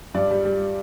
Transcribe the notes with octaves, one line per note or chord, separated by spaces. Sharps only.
G2 D5
G3
G3